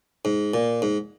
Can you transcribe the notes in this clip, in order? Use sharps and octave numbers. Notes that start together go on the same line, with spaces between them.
G#2
A#2
G#2